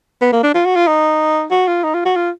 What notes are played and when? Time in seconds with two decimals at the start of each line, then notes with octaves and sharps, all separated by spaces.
0.21 B3
0.33 A#3
0.43 D4
0.54 F4
0.65 F#4
0.76 F4
0.87 D#4
1.51 F#4
1.68 F4
1.84 D#4
1.94 F4
2.05 F#4
2.16 F4